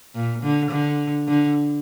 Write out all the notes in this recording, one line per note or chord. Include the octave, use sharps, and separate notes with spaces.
A#2
D3
D3
D3